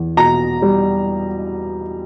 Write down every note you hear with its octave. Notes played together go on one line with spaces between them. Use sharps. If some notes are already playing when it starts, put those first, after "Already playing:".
Already playing: E2
B2 A#5
G3